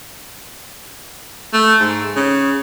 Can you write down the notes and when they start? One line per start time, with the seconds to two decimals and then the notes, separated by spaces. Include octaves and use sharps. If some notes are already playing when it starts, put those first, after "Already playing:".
1.53 A3
1.80 G#2
2.16 C#3